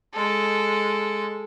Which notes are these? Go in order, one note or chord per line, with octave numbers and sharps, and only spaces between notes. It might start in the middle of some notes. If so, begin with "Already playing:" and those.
G#3 A4